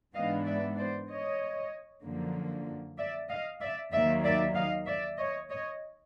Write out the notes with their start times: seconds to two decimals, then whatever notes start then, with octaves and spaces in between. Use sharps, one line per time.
0.14 G#2 E3 G#3 B3 D4 D#5 F5
0.46 D5 E5
0.77 C5 D5
1.09 C#5 D#5
2.03 F#2 D3 F3 A#3
2.98 D5 E5
3.29 D#5 F5
3.60 D5 E5
3.92 D#2 D#3 F#3 A#3 D5 E5
4.24 D5 E5
4.55 D#5 F5
4.86 D5 E5
5.18 C#5 D#5
5.50 C#5 D#5